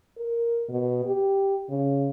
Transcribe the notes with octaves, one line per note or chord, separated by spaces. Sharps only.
A#4
B2
G4
C#3